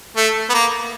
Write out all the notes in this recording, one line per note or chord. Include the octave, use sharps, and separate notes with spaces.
A3
B3
A#3